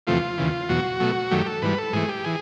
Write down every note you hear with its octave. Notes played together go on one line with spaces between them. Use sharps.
E2 C3 F3 A3 F4
D#2 C#3 E3
E2 B2 F#3 F#4
B2 F#3 A3
F#2 D#3 F#3 A3 G4
A4
G#2 E3 G3 B4
A4
G#2 E3 A3 G#4
G4
E3 G#4